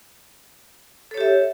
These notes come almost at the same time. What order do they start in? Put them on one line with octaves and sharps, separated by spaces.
A4 C#5 G4 E5